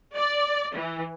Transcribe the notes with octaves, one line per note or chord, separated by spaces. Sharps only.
D5
E3